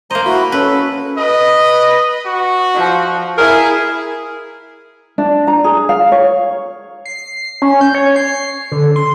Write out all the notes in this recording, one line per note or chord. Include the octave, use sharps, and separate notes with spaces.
A#3 C5 D#5 A#5
E4 F#4 B5
C#4 A4 B4
B4 D#5
F#4
F3
E4 G#4 A#4
D4
A#5
G#4
F5
C#5
C7
C#4
G6
C#5
C7
D3
C6